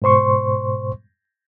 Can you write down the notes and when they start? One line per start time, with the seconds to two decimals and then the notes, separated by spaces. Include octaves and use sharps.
0.02 G#2 B2 C5 C6 C#6